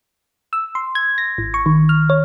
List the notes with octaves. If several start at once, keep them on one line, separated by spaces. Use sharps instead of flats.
E6
C6
G#6
A#6
G#1
C#6
D#3
F6
C#5